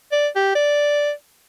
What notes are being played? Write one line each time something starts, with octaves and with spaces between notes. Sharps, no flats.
D5
G4
D5